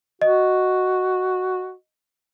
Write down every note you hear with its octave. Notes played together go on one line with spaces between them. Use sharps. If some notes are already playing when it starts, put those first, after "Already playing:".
F#4 D#5